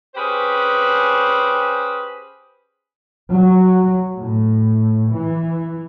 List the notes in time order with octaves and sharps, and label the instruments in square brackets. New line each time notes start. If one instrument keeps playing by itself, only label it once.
[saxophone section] C#4 G4 G#4 B4 C5
[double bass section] F#3
A2
E3